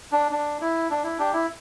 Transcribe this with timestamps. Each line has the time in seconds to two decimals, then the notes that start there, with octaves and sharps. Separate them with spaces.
0.12 D4
0.31 D4
0.61 E4
0.90 D4
1.04 E4
1.18 D4 G4
1.33 E4